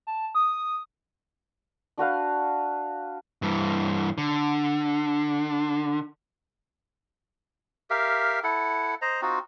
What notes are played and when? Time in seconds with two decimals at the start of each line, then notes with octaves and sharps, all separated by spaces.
0.07 A5
0.35 D#6
1.98 D4 F#4 B4 F5
3.42 G2 E3
4.18 D3
7.90 G4 A#4 E5 F5
8.44 E4 A4 F#5
9.02 C5 D#5 A#5
9.22 C4 D#4 F4 F#4